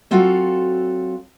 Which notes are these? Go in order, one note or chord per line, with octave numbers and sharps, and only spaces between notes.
F#3 C4 F4 F#4 A4 F5